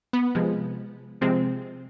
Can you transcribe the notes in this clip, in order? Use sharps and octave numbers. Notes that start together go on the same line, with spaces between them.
B3
C3 F3 G#3
C3 F3 G#3 C4